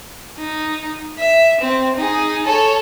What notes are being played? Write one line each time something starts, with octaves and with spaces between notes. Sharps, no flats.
D#4
E5
C4
D#4 G#4
A4 C#5